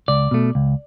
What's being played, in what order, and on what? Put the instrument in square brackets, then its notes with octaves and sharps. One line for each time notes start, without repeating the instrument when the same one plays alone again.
[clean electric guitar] C#2 D5
B2 A3
C#2